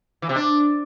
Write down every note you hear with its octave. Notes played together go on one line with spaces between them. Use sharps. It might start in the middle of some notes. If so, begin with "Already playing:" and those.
E3
C3
D4